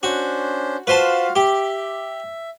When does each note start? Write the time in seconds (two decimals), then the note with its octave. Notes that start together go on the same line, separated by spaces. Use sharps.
0.03 C#4 D4 F#4 C5
0.87 F4 F#4 B4 C5 F5 A5
1.36 G4 E5